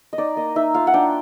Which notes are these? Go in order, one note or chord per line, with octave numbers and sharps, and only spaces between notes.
D#5
D#4 D5
A#3 D#5
D#4 E5
F4 F5
F#5
D4 G5